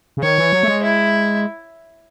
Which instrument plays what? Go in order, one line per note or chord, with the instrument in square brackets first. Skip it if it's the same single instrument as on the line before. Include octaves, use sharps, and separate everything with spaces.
[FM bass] C#3
[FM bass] D#3 [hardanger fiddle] C#5
[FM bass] E3
F#3
A3
G#3
[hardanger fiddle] E4